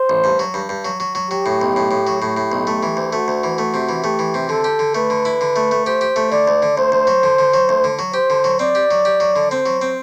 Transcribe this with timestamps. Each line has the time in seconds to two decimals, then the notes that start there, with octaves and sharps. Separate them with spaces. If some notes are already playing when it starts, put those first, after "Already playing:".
Already playing: C5
0.09 A1
0.24 G2
0.39 F#3
0.54 G2
0.69 G2
0.85 F#3
1.00 F#3
1.15 F#3
1.30 F#3 G4
1.46 A2
1.61 B1
1.76 A2
1.91 A2
2.07 F#3
2.21 A2 G4
2.37 A2
2.52 B1
2.67 A3
2.83 E3
2.97 D2
3.13 A3 F#4
3.28 D2
3.44 E3
3.58 A3
3.74 C3
3.89 E3
4.04 A3 G4
4.19 E3
4.34 C3
4.49 D3 A4
4.64 G4
4.79 D3
4.95 A3 B4
5.10 D3
5.25 E4
5.41 D3
5.56 A3
5.71 A3
5.86 G4 C5
6.01 G4
6.16 A3
6.31 D3 D5
6.48 D2
6.62 D3
6.77 D2 C5
6.92 D2
7.07 F#3
7.23 D3
7.38 D3
7.54 F#3
7.69 D2
7.84 D3
7.99 F#3
8.14 G4 C5
8.30 D3
8.44 F#3
8.59 C4 D5
8.75 G4
8.91 F#3
9.05 G4
9.20 F#3
9.36 D3
9.51 C4 C5
9.66 F#3
9.82 C4